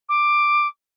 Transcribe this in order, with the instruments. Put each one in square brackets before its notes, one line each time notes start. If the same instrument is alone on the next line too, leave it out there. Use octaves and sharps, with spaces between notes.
[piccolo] D6